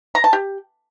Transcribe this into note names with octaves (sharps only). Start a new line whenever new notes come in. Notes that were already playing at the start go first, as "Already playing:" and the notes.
A#5
A5
G4